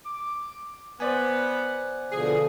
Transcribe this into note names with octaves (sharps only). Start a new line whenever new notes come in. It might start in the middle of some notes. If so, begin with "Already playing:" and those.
D6
B3 C5 D5 F#5 G#5
B2 D3 F3 G#4